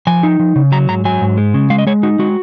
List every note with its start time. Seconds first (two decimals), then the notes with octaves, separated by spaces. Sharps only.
0.07 F3 G#5
0.23 D#4
0.39 F3
0.56 C#3
0.72 F#3 A#5
0.89 G#2 A#5
1.05 F#3 G#5
1.21 G#2
1.38 G#3
1.54 C#3
1.70 G#3 F5
1.78 D#5
1.87 G#3 C#5
2.03 D#4 F#4
2.19 G#3 F#4